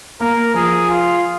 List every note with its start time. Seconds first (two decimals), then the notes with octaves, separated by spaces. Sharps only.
0.20 A#3 A#4
0.54 F3 G#4
0.89 F4